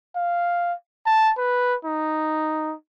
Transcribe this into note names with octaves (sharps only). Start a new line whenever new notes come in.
F5
A5
B4
D#4